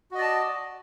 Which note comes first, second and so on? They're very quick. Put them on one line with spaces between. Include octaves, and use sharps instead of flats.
F#4 D#5 D5 A5